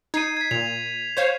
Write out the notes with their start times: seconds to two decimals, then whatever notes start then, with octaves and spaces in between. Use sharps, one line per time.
0.14 D#4 G#6 C7 D#7
0.37 G#6 B6
0.51 A#2 F7
1.17 C5 C#5 F5